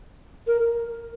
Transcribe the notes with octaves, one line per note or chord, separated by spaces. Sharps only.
A#4